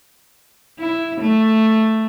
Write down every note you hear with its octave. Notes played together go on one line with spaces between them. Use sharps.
E4
A3